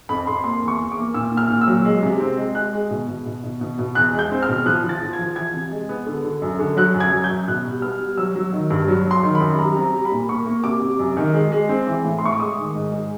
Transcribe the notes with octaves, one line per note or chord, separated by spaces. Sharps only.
F2 B5
F2 C6
A#3 C6
E2
C#6
E2
D6
A#3
A#2 E6
A#2
F6
A#2
E6
F#3
G#3
C3
C4
G#3
G#3 F#6
G#3
B2
B2
B2
B2
B2
B2
E2 F#6
G#3
G6
C4
F6
B2
F3 F#6
F3
A6
F3
G#6
F3
E3 G#6
C3
G#3
B3
D3
D3
F#2
D3
F#3 F#6
F#2
G#6
F#3
G6
F#2
B2 F#6
G3
B3 F6
G3
F#3 E6
F#3
D#3
G2
F#3
F#3
C6
D#3
B5
F#2
G3 A#5
C4
A#5
G3
B5
A#2
A#3 C#6
A#3
C3 D6
C3
F#2
D#3
G#3
G#3
C4
E3
A2
C6
A2 C#6
D6
G#3 D#6
D#3
G#2
G#3